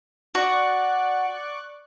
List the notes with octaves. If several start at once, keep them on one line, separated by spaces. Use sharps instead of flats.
F#4 D5 C#6 F#6